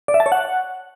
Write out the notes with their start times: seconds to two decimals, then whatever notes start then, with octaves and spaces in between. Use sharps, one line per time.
0.08 D5
0.14 E5
0.20 A5
0.26 C#5
0.32 F#5